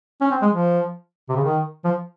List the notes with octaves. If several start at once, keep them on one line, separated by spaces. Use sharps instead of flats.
C#4
C4
G#3
F3
C3
C#3
D#3
F3